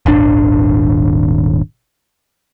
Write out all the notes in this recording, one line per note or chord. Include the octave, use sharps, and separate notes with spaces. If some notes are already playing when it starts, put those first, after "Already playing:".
D#1 G#1 D4